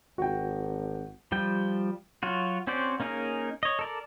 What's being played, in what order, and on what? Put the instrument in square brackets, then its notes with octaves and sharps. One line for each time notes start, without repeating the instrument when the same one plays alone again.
[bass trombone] G#1 [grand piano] F#4 G5
[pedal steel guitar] F3 G3 G5
F#3 F4 F#4
C4 C#4 F#4 C5 D5
A#3 C#4 D#4 G#4 A#4
C#5 D#5
A4 A#4 D5